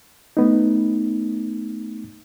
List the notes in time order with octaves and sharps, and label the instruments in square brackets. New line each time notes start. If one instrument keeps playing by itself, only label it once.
[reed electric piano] A3 B3 D#4